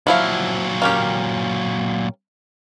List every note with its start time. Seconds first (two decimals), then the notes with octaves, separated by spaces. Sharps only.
0.07 A#2 F3 F#3 E4 F5
0.82 A#3 C#4 G4